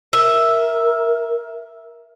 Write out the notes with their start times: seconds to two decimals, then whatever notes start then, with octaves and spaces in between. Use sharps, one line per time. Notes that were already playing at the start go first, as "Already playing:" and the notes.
0.13 A#4 E5